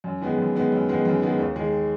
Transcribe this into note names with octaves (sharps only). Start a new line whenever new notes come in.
F#2
D#3 G#3 B3
F#2
D#3 G#3 B3
F#2
D#3 G#3 B3
F#2
D#3 G#3 B3
D#2
D#3 G#3